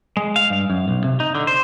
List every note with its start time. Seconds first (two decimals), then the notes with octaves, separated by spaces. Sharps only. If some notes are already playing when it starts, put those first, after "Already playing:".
0.17 G#3
0.36 F5
0.50 G2
0.70 F#2
0.88 B1
1.04 C3
1.20 D#4
1.35 D3
1.47 C5